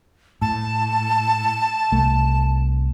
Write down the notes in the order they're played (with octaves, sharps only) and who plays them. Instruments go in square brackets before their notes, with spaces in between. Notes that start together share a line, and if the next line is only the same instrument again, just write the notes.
[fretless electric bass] A2 [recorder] A5
[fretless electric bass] C2 A3